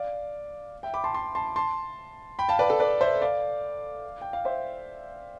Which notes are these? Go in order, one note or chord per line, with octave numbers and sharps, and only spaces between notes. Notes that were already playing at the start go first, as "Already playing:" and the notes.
Already playing: D5 F5
E5 G5
B5 D6
A5 C6
A5 C6
A5 C6
A5 C6
G5 B5
F5 A5
B4 D5
A4
B4 D5
C5 E5
D5 F5
G5
F5
C5 E5